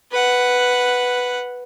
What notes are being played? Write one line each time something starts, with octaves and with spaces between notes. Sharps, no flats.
B4 F#5